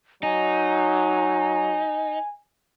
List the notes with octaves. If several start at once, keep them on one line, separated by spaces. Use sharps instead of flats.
F#3 D#4 G#5